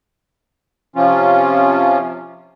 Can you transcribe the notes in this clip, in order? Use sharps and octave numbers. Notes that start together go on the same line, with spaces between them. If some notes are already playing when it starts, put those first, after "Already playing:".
C3 F3 C#4 F4